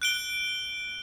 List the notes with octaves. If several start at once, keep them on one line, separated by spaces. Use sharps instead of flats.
F#6 D7 G7